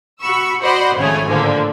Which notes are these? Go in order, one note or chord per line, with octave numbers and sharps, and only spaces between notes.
F#4 B5 C#6 E6
F#4 C5 D5 D#5 F#5 B5
G#1 F2 C#3 A3 C#5 G#5
A2 D3 F3 A#3